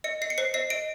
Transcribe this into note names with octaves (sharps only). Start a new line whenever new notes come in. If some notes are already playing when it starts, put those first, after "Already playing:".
D#5 C#7
D#5 C7
C#7
C5 C7
D#5 C7
D#5 D7